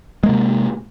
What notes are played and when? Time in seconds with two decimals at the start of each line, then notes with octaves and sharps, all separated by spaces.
0.23 G#3
0.26 A#3
0.29 C3